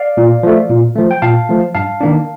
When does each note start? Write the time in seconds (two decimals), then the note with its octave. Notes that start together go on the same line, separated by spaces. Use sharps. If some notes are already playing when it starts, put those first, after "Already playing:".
Already playing: D5 F5
0.17 A#2
0.43 F3 A3
0.70 A#2
0.96 F3 A3
1.11 G5
1.22 A#2 F5 A5
1.49 F3 A3
1.75 G2 F5 A5
2.01 D#3 A#3 D4